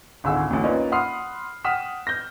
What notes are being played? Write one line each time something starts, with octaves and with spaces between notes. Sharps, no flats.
G#1 C#2 D3 G#5 E6
A1 D2
A#3 C#4 D#4 F4 B4 D5
F#5 B5 C6 D#6 F6 C7
F#5 G5 D#6 F6 B6 E7
G6 A#6